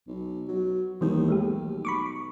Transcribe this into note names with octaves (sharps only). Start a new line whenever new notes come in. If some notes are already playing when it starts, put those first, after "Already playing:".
B1
F#3
D#2 E3 G3 B3
G#3 A3 G4
B1
B5 C#6 D6